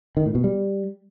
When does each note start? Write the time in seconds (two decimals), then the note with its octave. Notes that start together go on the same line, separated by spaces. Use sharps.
0.17 D#3
0.26 A2
0.35 B2
0.44 G3